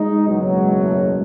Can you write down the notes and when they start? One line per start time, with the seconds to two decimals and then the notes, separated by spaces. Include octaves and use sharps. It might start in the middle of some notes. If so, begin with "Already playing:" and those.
Already playing: G#3 D#4
0.24 F#1 E2 B2 F#3
0.80 A3
0.98 G#3